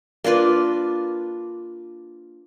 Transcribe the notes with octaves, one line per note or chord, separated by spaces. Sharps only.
A#3 D4 F4 B4